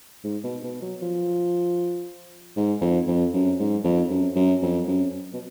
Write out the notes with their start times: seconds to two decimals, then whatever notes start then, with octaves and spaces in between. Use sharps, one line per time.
0.24 G#2
0.44 B2
0.63 B2
0.82 F#3
1.02 F3
2.56 G#2
2.81 F2
3.07 F2
3.34 F#2
3.59 G#2
3.84 F2
4.10 F#2
4.36 F#2
4.62 F2
4.88 F#2
5.33 B2